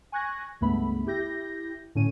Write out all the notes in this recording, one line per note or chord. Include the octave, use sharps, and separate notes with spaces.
G#5 C#6 F#6 G#6 A#6
C#2 G2 A3 B3 B5
E4 G4 G6 A#6
A2 D3 C#4 D#7